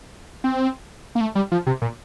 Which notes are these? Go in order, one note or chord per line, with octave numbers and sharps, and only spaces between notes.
C4
A#3
A3
G3
F3
C3
A#2